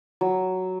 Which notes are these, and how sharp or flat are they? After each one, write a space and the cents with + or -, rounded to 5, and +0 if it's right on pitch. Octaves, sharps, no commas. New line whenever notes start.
F#3 +5